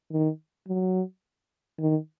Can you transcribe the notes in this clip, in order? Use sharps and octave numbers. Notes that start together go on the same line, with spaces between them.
D#3
F#3
D#3